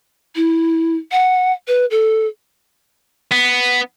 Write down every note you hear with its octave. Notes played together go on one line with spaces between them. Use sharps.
E4
F#5
B4
A4
B3